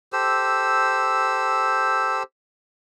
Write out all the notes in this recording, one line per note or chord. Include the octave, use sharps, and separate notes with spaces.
G4 A4 C5 E6